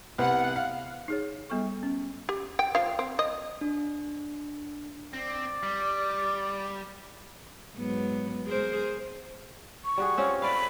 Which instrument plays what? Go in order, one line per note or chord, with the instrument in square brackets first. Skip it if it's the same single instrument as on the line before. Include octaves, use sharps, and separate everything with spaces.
[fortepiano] C2 B3 [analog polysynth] F#5
[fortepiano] F5
[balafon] D#4 G#4 C#5
G3 B3 A4 C#6
C#4
[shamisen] G4
G5
F3 F5
C4
D#5
[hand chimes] D4
[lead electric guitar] C4 [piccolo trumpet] D5
[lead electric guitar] G3
[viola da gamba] G#2 F#3 B3
G#4 A#4 C5
[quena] C#6
[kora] G3 F#4 G#4
C4 C#4 F4
[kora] A3 D5 F5 [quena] B5